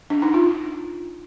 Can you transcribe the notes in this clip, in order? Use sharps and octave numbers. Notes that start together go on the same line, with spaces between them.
D4
D#4
F4